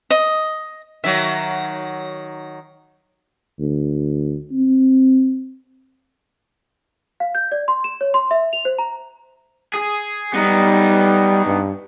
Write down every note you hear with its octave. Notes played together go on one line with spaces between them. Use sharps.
D#5
D#3 F#3 E5
D2
C4
F5
G6
D5
C6
E7
C#5
C6
E5
F7
C5
A#5
G#4
G3 B3 D#4
G2